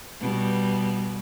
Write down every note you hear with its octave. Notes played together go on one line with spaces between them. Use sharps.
B2 G3